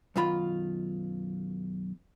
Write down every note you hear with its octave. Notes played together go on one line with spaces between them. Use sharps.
B1 F#2 D#3 F4 B5